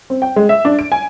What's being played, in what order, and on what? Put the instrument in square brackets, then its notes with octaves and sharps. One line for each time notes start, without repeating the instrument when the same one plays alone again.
[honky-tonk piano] C4
G5
G#3
E5
D4
D7
G#5